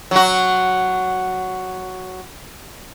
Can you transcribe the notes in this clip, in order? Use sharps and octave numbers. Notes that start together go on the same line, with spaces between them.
F#3 F#4